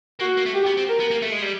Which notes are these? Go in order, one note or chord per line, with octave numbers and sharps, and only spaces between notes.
A#3 F#4
A#3
A3
G4
B3
C4
A#4
B3
A#3
A3
G#3
G3